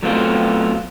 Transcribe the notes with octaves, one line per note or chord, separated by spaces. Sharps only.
F#3 A3 B3 C4 F4